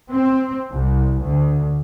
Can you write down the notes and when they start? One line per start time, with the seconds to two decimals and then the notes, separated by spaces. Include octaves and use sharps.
0.11 C4
0.72 C2
1.23 D2